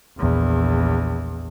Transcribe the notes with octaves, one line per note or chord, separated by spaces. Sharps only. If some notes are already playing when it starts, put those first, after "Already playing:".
A#1 E2